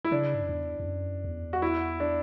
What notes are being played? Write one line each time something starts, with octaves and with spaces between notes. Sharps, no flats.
E4
C#3 D4
G#2
F#2
E2
E2
F#2
E2
F#4
E4
D4